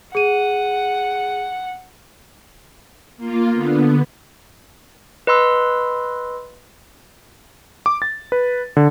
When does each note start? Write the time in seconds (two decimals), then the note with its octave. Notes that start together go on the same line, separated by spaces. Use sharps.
0.15 G#4 F#5 D#7
3.17 A#3 F4
3.52 D3 B3
5.27 B4 D#5 B5 C6 E6
7.86 D6
8.02 A6
8.32 B4
8.77 D3